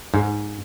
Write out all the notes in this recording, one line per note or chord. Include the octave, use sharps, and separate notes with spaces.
G#2